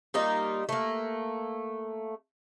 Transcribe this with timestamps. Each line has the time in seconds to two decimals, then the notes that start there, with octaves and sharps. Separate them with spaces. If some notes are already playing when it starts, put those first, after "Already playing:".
0.14 G3 A#3 D#4 F4
0.69 A3 A#3